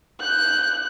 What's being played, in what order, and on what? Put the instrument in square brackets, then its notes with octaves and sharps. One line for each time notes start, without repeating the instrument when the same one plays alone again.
[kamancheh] F#6 [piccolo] G6